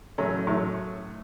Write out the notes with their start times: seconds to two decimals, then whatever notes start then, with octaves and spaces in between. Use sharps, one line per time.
0.18 A2 F#3 A3 C#4
0.47 A2 F#3 A3